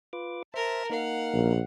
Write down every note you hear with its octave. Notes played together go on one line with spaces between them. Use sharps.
F4 B4 D6
A#4 C5 E5 A5
A#3 D#4 A#4 F5 F#5
A#1